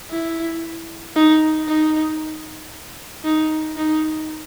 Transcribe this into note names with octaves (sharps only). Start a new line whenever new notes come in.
E4
D#4
D#4
D#4
D#4